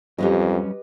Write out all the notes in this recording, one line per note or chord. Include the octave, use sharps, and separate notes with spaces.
F2 F#3 G3 C#4 G4 B4 D#5